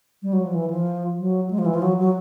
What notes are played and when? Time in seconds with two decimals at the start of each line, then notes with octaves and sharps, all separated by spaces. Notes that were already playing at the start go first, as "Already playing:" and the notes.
0.22 G3
0.33 F#3
0.44 F3
0.54 E3
0.70 F3
1.18 F#3
1.51 G#3
1.59 F3
1.66 E3
1.75 F3
1.82 F#3
1.98 F#3